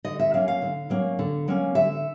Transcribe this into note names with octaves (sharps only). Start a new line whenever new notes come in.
D3 D#5
E5
F#3 A#3 C#4 F5
F5
D3
F#3 A#3 C#4
D3
F#3 A#3 C#4
D3 E5